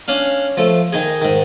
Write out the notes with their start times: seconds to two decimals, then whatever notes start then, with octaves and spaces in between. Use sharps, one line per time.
0.08 C#4 D4 F5
0.57 F3 A3
0.93 D#3 D#4 G#4
1.21 G#2 D#3